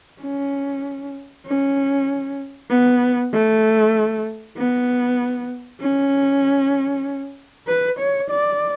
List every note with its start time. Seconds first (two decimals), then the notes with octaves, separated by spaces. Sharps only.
0.21 C#4
1.46 C#4
2.70 B3
3.33 A3
4.57 B3
5.81 C#4
7.67 B4
7.99 C#5
8.30 D5